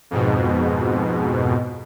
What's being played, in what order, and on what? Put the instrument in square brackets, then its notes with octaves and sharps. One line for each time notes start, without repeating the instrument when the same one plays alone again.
[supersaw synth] F2 G#2 B2